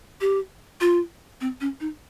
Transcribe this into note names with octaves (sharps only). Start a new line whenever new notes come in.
G4
F4
C4
C#4
D#4